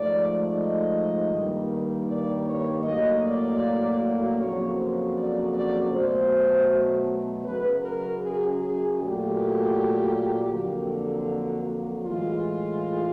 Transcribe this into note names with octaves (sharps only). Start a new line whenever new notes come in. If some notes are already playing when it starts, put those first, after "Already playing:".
Already playing: G#2 F3 A3 D5
D#5
G2 D#3 G3 A#3
D5
C#5
A2 F#3 A#3 D#5
D5
F2 C#3 F#3 A#3 C#5
C5
D5
D5
B2 F#3 A3 C5
F#2 C#3 F#3 B4
A#4
G#4
G#4
A#2 F#3 A3 G4
F2 D3 F#3 A#3
A2 E3 G#3 F4